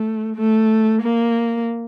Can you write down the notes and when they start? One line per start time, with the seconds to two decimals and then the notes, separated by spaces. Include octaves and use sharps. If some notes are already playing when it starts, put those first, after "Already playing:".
Already playing: A3
0.36 A3
1.02 A#3